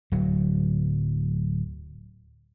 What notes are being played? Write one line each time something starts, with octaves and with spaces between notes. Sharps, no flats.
D1 F#3